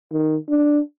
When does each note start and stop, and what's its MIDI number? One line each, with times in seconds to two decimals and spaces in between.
0.12 0.37 51
0.49 0.79 62